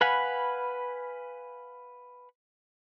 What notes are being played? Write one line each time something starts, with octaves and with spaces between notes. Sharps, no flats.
B4 F5 F#5 G#5 B5